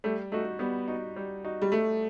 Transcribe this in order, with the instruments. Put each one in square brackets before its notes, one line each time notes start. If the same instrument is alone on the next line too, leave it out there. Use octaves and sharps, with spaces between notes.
[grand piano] G3 [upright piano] A3
[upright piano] A3 [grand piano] D#4 F#4
[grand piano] G3 [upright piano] B3
[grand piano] D#4 F#4
G3
D#4 F#4
[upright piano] G3
[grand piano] G3 [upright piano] A3